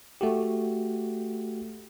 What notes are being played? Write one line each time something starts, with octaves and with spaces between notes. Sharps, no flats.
A3 F#4 G4